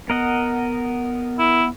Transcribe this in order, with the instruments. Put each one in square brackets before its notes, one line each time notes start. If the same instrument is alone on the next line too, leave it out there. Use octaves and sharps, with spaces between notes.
[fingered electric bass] B3 [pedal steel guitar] A#4 D#5 F#5
[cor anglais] E4